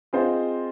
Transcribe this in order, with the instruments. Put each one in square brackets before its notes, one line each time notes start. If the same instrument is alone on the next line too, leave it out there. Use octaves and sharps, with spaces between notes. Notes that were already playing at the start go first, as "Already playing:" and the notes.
[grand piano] C4 F4 G#4 C5 D#5